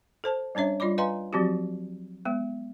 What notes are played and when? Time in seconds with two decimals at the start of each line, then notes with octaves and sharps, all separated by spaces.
0.24 A4 C5 A5
0.55 G3 C#4 D4 C#5 E5
0.80 G3 F4 D5 D#5 B5 D6
0.98 B4 D#5 F5 G#5 A#5 C6
1.33 F3 F#3 C4 F#4 G4
2.25 G#3 B3